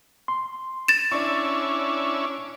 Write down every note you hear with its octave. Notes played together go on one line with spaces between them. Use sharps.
C6
A6 E7
C#4 D4 E4 D5 C#6